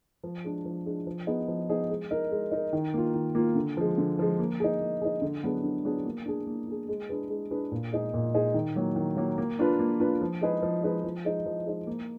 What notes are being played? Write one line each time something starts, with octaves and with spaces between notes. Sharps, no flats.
F3
G#3 D4
F3
G#3 D4
F3
B3 D#4 G#4
F3
B3 D#4 G#4
G#3
D#4 A#4
G#3
D#4 A#4
D#3
A#3 F4
D#3
A#3 F4
D3
F3 G#3
D3
F3 G#3
A#3
D#4 G#4
A#3
D#4 G#4
D3
F#3 B3 D4 G#4
D3
F#3 B3 D4 G#4
A#3
D4 G#4
A#3
D4 G#4
G#3
D4 G#4 B4
G#3
D4 G#4 B4
A#2
G#3 D#4 G#4
A#2
G#3 D#4 G#4
D#3
F#3 A#3
D#3
F#3 A#3
A#3
D4 F4 B4
A#3
D4 F4 B4
F3
G#3 D#4 G#4 B4
F3
G#3 D#4 G#4 B4
F3
G#3 D#4
F3
G#3 D#4
A#3